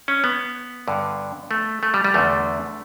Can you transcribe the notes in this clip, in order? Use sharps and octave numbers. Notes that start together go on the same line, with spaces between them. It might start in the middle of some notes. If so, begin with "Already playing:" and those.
C#4
B3
G2 D3
A3
A3
G3
G3
E2 D3 A3